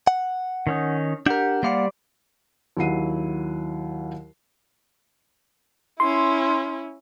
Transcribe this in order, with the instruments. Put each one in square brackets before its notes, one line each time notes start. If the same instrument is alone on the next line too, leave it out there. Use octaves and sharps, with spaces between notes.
[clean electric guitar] F#5
[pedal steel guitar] D#3 C#4 D#4
[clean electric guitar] D4 A#4 [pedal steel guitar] G4 F#5 G6
[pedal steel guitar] G3 C5 D5 [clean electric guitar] A#3 F5 F#5
[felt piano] D#2 F#3 E4 F#5 C7 D#7
[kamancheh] C#4 E4 [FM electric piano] C6